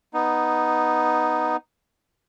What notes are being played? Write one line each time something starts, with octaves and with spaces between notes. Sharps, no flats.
B3 D#4